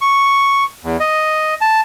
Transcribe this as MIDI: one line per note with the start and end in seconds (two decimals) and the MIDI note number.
0.01 0.64 85
0.84 0.97 40
1.00 1.54 75
1.61 1.81 81